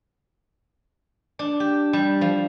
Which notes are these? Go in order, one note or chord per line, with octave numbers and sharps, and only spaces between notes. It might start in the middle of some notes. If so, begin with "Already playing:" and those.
D4
G4
G3
F3